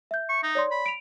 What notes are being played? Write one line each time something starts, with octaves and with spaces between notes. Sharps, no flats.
E5 G6
C#6
D#4
C#5 D5 C6
B5
D7 F7